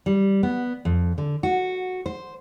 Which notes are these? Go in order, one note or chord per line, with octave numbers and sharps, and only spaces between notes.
G3
B3
F2
D3
F#4
C5